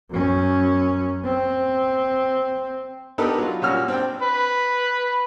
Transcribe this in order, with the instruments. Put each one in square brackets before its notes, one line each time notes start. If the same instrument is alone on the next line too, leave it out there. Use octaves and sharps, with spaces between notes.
[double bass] F#2 C#4
C4
[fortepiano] B3 D4 D#4 G4 A4 A#4
F#3 F4
A#2 G3 C#4 F#4 E6 F6
C4 D4 G5
[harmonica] B4